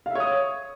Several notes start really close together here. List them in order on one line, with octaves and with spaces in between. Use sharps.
F5 E5 C#5 D#6